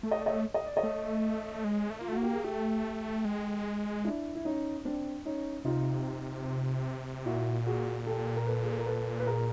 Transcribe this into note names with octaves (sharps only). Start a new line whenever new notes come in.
A3
D#5
D5
C#5 D#5
D#5
D5
C#5 D#5
A3
G#3
A3
A#3 F4
A3 F#4
A#3
G4
G#4
A3 G4 A4
G#3
D4 E4
E4
C#4 D#4
C4 D4
C#4 D#4
C3 D#4 F4
A#2 E4 F#4
F#4 G#4
G4 A4
A#4
A4 B4
G#4
A4
A#4
A4 B4
B4
G#4 A#4